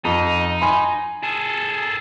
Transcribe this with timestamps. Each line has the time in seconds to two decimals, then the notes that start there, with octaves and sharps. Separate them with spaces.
0.05 F2 D#4
0.61 G#5 B5 C6
1.23 G#4 A4